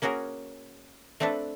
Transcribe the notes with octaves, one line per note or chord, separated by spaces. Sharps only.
A#3 C#4 F#4 G#4 A#4
A3 C4 D4 A4 B4